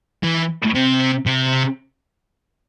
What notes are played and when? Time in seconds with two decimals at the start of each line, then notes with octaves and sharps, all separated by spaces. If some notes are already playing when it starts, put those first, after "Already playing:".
0.24 E3
0.74 C3
1.26 C3